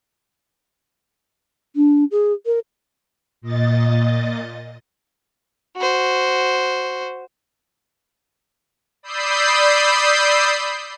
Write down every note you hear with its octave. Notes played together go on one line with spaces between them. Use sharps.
D4
G#4
A#4
A#2 D#5 A6
F#4 C5
D5 B5 D#6 E6 G6 C7